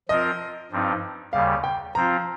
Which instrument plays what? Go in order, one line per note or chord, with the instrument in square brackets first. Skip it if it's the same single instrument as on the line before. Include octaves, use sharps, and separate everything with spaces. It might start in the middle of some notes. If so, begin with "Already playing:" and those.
[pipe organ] F3 C4 F4 A#4 [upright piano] D#5
[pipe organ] G2 F3 C4 D#4
[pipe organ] D#2 C#3 G3 [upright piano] F5
[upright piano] G5
[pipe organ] F3 C4 F4 [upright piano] A#5